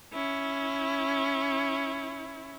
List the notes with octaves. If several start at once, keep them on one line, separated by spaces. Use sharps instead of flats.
C#4 E4